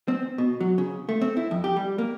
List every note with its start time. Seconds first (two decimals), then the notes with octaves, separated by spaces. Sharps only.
0.08 C4
0.38 B2
0.61 F#3
0.78 C#3
1.09 A3
1.21 C4
1.37 E4
1.51 F2
1.64 G4
1.77 G3
1.98 A#3